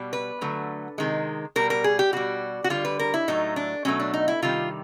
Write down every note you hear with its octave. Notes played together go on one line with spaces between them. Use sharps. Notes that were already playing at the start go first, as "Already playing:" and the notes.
Already playing: B2 G3
B4
D3 F#3 A3
C3 D#3 G#3
B2 G3 A#4
A#4
G#4
G4
B2 G3 F#4
F#4
D3 G3 F4
B4
A#4
E4
A2 F#3 A3 D#4
D4
B2 F#3 A3 C#4
D4
D#4
E4
C3 D#3 G3 F4